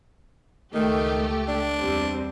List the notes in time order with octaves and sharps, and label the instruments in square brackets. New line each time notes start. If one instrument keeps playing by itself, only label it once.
[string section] C#2 A3 G4 [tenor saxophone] D#3
[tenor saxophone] D4
[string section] E2 G3 C4